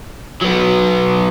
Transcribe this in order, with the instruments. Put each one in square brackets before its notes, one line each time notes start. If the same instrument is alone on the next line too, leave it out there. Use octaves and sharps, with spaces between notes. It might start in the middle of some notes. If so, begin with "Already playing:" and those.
[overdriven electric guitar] F#3 B3